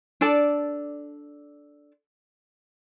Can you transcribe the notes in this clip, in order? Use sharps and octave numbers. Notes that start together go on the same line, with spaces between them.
D4 A4 D5 A5